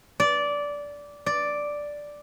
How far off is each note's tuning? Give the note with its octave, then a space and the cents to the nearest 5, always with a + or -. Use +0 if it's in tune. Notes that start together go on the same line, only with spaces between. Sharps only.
D5 -15
D5 +0